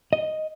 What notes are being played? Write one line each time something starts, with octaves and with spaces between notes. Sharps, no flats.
D#5